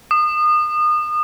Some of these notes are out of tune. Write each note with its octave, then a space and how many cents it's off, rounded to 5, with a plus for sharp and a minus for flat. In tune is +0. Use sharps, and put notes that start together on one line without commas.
D#6 -30